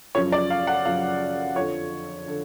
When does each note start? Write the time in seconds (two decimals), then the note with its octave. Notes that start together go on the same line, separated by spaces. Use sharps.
0.15 F#2 C#3 F3 C#5
0.32 D5
0.50 F5
0.67 F#5
0.85 F#2 C#3 F3 F5
1.55 F2 D3 F3 C#5
2.28 D3